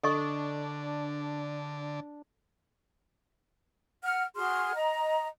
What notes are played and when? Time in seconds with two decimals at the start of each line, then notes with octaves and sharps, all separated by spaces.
0.04 D3 D4 A4 D#5 C#6
4.04 F#5 F6
4.35 F#4 G#4 C6 F6
4.75 D#5 A#5